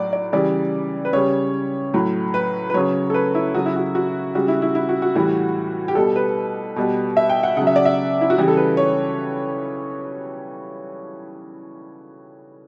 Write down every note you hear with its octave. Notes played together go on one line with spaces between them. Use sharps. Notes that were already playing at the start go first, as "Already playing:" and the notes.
Already playing: A2 F#3 D5
D5
C#3 E3 G3 D5
B4
C#3 G3 C#5
A2 F#3
B4
B4
C#3 F#3 C#5
A4
B4
E4
C#3 F#3 F#4
E4
F#4
F#4
C#3 G3 F#4
E4
E4
E4
F#4
F#4
A2 E3 G3
G4
B2 G3 A4
B4
B2 G3
E5
G5
F#5
C#3 F#3 F#5
E5
D5
E5
E4
F#4
C#3 E3 G3 G4
A4
B4
C#5